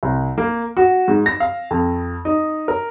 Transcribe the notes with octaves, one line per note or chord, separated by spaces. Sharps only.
C2
A#3
F#4
G#2
A#6
F5
F2
D#4
A#4